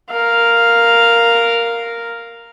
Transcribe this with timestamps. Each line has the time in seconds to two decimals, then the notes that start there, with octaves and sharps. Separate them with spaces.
0.11 A#4 F5